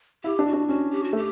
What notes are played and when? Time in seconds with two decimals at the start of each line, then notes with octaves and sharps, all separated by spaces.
0.24 E4 G4
0.39 D4
0.47 F#4
0.53 D4
0.68 C#4 F#4
0.91 G4
1.04 F#4
1.13 A3
1.16 G4